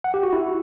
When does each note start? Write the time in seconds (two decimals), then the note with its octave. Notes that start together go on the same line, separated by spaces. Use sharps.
0.04 F#5
0.14 G4
0.23 F#4
0.33 E4